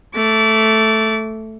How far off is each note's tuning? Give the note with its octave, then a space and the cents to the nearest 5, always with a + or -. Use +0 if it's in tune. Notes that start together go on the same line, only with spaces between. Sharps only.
A3 +0 D6 -30